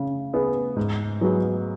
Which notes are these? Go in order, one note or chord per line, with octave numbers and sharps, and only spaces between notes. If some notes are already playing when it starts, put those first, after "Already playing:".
Already playing: C#3
B3 G#4
G#2
F#3 B3 G#4